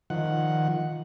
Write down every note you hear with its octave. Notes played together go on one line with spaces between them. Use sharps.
D#3 F3 F#5